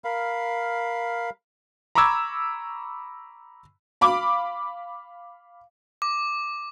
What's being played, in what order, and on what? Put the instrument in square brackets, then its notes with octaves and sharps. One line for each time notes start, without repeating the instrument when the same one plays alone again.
[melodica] A#4 F5 B5
[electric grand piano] A#5 B5 C#6 D6 E6 G#6
[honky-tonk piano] F5 B5 D6
[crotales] D6